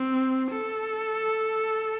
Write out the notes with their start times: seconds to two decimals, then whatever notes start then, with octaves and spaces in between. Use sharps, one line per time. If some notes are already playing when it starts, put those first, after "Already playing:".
Already playing: C4
0.51 A4